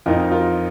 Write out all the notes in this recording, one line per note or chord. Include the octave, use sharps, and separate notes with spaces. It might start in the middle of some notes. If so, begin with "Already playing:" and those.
F2 F3 D#4 F4 A#4
F4 A#4